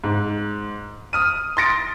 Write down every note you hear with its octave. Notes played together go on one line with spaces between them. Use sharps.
G#2
D#6 F6 D#7
C6 D#6 A6 A#6 C#7 D7